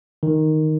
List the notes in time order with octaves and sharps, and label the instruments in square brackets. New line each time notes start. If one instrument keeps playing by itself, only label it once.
[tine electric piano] D#3